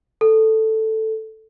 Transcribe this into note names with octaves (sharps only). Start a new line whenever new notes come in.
A4